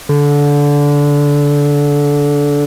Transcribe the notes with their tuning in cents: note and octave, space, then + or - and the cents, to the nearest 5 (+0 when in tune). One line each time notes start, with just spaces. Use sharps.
D3 -20